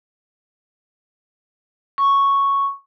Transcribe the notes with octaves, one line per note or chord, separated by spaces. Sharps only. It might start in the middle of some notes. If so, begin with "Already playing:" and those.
C#6